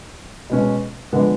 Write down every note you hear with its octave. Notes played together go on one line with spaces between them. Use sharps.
B2 G#3 C#4
D3 F3 G#3 B3